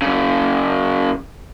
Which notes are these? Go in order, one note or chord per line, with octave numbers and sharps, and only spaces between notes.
F#2 C#3